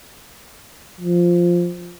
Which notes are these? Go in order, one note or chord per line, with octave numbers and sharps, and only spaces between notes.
F3